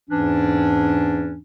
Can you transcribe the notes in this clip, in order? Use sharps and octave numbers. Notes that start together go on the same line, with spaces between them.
E2 G#2 E3 C#4 D4